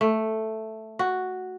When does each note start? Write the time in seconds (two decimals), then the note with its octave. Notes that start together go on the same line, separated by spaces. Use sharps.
0.01 A3
0.99 F#4